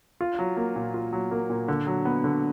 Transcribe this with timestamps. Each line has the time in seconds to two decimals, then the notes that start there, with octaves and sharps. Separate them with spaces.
0.21 F4
0.39 F#3
0.57 A#3
0.76 A#2
0.94 F4
1.13 F#3
1.31 A#3
1.50 A#2
1.68 D3
1.87 F#3
2.05 B3
2.24 D3